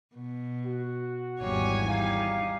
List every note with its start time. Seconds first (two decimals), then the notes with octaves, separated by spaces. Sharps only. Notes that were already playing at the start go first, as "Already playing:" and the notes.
0.15 B2
0.65 F#4
1.39 G#1 E2 G3 C#5 G#5
1.88 G3 D#4 F5